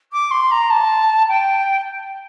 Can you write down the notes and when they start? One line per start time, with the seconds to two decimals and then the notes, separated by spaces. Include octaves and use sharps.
0.12 D6
0.31 C6
0.51 A#5
0.70 A5
1.28 G5